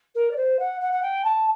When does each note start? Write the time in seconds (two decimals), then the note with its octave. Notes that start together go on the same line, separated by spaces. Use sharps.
0.14 A#4
0.31 D5
0.36 C5
0.59 F#5
0.80 F#5
0.92 F#5
1.02 G5
1.24 A5